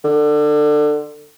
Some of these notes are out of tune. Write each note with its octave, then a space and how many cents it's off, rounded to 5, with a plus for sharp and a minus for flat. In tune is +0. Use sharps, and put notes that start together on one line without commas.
D3 +25